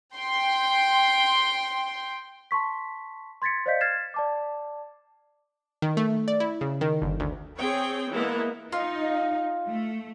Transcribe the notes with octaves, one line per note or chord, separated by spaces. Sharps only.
G5 C6
A5 C6 C#6 B6
C6 G#6 A6 B6 C#7
C5 D5 D#5 F5 G6 B6
F6 G#6 A6 C7 E7
D5 A5 D6
D#3
A3
D5
E4
C#3
D#3
G1
D2
C4 G#4 C#5 G5
E3 G#3 A#3 B3 E4
D#4 F4
A3